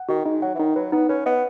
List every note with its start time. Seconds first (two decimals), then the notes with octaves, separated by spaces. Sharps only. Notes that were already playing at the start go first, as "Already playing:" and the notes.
Already playing: F#5
0.09 D#3 F#4
0.25 G#3 D#4
0.42 F#3 F#5
0.55 E3
0.59 D#3 D#4
0.76 F#3 B4
0.92 B3 D#4
1.09 C#4 B4
1.26 B3 D#5